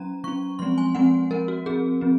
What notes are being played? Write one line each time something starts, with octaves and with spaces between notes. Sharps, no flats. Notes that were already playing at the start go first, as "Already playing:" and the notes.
Already playing: F#3 C#4 A#5
F#3 C#4 C#6
F3 G#3 C4 C6
G#5
F3 G#3 C4 F#5
F3 C4 A#4
F#4
F3 C4 G#4
F3 C4